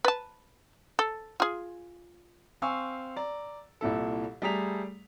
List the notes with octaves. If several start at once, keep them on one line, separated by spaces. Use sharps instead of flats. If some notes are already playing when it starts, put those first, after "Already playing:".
B4 A5
A4
F4 G#4
C4 F5 G#5 C#6 E6
D5 A#5
C2 A#2 E4 A4
G3 A3 G#4 A#5 B6 F7